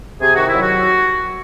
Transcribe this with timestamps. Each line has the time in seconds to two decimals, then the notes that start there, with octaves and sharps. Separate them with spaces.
0.21 C3 G#4
0.35 D#3 F#4
0.48 E4
0.54 F#3
0.62 F#4